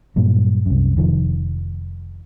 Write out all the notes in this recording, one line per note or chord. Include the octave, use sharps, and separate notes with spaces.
G2 A#2 F#3
C2 F#2
F1 D#3 F3